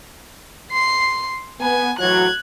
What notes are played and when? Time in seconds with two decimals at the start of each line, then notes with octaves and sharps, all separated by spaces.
0.72 C6 C7
1.61 B3 G#5
1.99 A2 E3 F#3 F#6 G#6